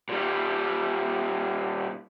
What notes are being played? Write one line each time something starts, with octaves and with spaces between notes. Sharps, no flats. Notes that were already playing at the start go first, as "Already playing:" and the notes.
A#2 G3